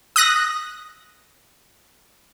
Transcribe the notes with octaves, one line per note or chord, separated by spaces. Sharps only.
D#6 F#6 A#6